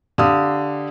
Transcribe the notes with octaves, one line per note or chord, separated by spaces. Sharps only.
D3 G4 F5 D#6